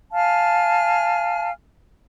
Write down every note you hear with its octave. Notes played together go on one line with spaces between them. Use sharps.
F5 G#5 A5 F6